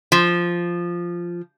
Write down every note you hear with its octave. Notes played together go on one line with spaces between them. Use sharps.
F3